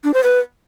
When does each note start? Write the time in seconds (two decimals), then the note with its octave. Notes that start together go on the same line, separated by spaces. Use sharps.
0.04 D4
0.14 C5
0.23 B4